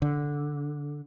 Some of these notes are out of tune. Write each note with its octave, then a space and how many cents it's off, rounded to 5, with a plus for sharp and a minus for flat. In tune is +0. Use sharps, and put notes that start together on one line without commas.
D3 -5